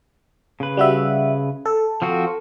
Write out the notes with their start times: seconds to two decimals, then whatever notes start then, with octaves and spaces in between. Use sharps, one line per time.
0.60 C#3 B4
0.77 G3 F#4 E5
1.65 A4
2.02 F3 C4 F#4